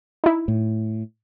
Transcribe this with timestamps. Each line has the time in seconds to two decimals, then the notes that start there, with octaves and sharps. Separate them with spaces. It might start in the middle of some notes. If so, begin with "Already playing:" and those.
0.24 D#4 E4
0.48 A2